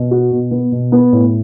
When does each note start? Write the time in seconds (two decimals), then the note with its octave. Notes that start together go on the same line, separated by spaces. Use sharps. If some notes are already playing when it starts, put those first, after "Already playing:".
Already playing: B2
0.11 F#4
0.31 B2
0.51 B3
0.72 B2
0.92 B3
1.13 A2